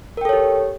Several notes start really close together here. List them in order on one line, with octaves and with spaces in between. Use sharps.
A#4 G5 A4 C#5 G4